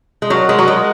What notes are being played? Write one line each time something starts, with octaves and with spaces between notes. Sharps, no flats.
G#3
F#3 F4 A#4 D#5 F#5
G#3
F#3
G#3